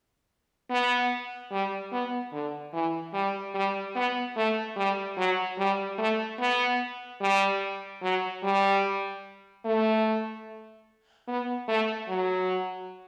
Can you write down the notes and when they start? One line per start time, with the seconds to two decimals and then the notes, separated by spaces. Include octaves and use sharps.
0.70 B3
1.51 G3
1.92 B3
2.32 D3
2.73 E3
3.14 G3
3.54 G3
3.95 B3
4.37 A3
4.76 G3
5.17 F#3
5.58 G3
5.98 A3
6.39 B3
7.21 G3
8.02 F#3
8.43 G3
9.65 A3
11.28 B3
11.68 A3
12.09 F#3